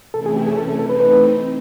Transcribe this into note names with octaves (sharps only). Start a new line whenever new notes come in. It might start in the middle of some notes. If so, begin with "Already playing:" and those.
C3 E3 A3 C#4 E4 A4
G#4
G4
G#4
A4
A4
E3 A3 C4 D#4 A4
B4
B4